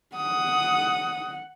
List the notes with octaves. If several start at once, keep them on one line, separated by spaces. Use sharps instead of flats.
F#5 D#6